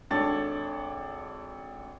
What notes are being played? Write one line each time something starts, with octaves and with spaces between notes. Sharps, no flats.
G#1 D4 A4 C#5 A6